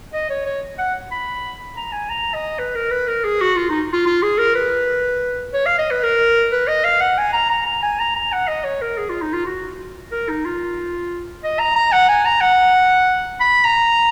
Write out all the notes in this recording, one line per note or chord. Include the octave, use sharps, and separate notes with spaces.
D#5
C#5
C#5
F#5
B5
A#5
G#5
A#5
D#5
B4
A#4
B4
A#4
G#4
F#4
F4
D#4
F4
F4
G#4
A#4
B4
C#5
F5
D#5
B4
A#4
B4
D#5
F5
F#5
G#5
A#5
A#5
A#5
G#5
A#5
A#5
F#5
D#5
C#5
A#4
G#4
F4
D#4
F4
F#4
A#4
D#4
F4
D#5
A#5
A#5
F#5
G#5
A#5
F#5
B5
A#5